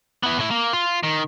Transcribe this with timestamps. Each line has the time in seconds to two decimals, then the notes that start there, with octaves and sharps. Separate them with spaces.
0.23 B3 E4
0.38 A2 E4
0.51 A#3
0.73 F4
1.03 D#3